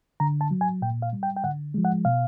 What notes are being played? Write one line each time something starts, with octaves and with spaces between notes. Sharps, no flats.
D3 A#5
A5
F#3
G#5
A#2 G5
F5
G3
G5
G5
D3 F#5
F3 G#3
F#5
B2 F5